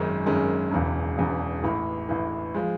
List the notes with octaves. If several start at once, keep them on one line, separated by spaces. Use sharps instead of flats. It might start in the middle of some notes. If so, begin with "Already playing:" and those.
Already playing: G#1 F#2 D#3 G#3 C#4
G#1 F#2 D#3 G#3 C#4
E1 E2 C#3
E1 E2 C#3
A1 A2 E3
A1 A2 E3
F3 G#3